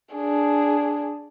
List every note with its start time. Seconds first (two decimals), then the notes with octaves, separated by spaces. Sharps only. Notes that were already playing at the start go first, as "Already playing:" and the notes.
0.15 D4 G#4